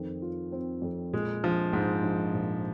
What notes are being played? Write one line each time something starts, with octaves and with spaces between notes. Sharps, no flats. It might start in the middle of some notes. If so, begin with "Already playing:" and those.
Already playing: F2 D#3 C4 F4
F4
C4
F2
A#2 G#3
A#1 F3
G#2 G#3
A#1
A#2